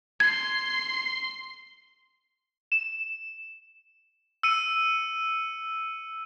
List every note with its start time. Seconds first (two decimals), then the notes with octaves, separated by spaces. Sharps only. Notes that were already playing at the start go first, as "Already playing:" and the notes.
0.20 C6 G#6 C7
2.72 E7
4.43 E6 C#7 D#7